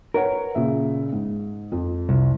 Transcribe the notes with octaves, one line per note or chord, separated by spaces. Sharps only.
A#4 B4 C#5 F#5
A#2 C#3 E5
G#2
F2
C2